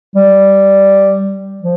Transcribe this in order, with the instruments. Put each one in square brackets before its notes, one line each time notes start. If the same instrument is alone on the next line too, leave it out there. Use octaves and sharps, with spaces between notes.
[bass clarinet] G3
F3